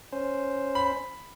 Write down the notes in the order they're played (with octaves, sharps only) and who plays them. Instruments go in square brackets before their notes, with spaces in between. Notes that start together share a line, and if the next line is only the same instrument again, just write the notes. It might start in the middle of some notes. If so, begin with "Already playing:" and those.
[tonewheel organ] C#4 C5
[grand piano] B5